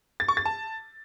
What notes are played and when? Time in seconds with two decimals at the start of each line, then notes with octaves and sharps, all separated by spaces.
0.20 A6
0.28 C#6
0.37 A6
0.45 A5